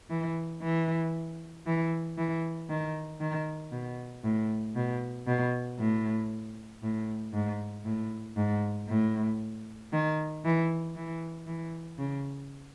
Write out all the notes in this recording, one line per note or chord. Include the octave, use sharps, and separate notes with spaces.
E3
E3
E3
E3
D#3
D#3
B2
A2
B2
B2
A2
A2
G#2
A2
G#2
A2
D#3
E3
E3
E3
C#3